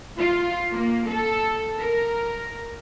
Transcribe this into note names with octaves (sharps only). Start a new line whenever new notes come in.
F4
A#3
A4
A#4